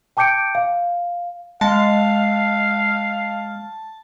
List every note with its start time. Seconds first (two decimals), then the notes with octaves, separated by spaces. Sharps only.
0.17 G5 A5 D6 G6 C#7 D7
0.55 F5
1.61 G#3 F5 A5